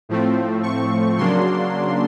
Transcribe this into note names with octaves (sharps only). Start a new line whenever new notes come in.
A2 F3 A3 C4
C#6
C#3 F#3 A#3 D4 C6